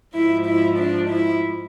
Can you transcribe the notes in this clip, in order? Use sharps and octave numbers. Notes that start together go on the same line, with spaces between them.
G#2 F3 E4
E4
D4
E4